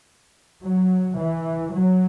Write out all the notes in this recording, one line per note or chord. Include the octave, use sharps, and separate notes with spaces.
F#3
E3
F#3